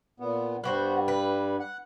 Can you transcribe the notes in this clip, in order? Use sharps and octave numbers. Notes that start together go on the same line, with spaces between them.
A#2 B3
G2 G3 B3 F#4 C5
B4
F#5